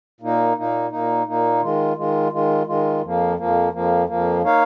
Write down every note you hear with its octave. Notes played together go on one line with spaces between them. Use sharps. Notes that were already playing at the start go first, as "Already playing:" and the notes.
A#2 A#3 D#4
A#2 A#3 D#4
A#2 A#3 D#4
A#2 A#3 D#4
D#3 G#3 F4
D#3 G#3 F4
D#3 G#3 F4
D#3 G#3 F4
F2 F3 A#3
F2 F3 A#3
F2 F3 A#3
F2 F3 A#3
A#3 D#4 C#5 F5